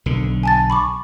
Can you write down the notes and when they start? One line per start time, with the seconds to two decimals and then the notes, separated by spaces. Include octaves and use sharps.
0.06 B1 D3
0.43 G#5 A5 A6
0.70 B5 C#6 D6